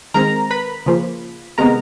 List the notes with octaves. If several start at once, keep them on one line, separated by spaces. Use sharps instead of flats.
D#3 G#3 C4 A#4 A#5
B4 B5
C#3 F3 A#3
C3 D#3 G#3 B3 A#4 A#5